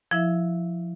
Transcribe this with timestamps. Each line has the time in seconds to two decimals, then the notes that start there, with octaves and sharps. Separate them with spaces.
0.11 F3 E4 E5